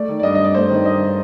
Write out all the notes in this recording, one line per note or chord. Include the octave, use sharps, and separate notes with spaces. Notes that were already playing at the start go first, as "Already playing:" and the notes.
Already playing: A3 D5
D#3
D5
G2 D#5
G2 D#5
D5
A3 C5
D#3
G2 D#5